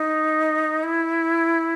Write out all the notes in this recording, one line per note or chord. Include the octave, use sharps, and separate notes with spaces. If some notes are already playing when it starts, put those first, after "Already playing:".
Already playing: D#4
E4